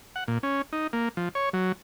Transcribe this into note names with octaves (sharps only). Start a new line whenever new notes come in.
F#5
A#2
C#4
D#4
A#3
F3
C#5
F#3